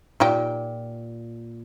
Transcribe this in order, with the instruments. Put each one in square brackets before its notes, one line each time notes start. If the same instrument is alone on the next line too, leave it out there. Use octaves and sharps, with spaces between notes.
[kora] A#2 [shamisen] D#4 G4 G5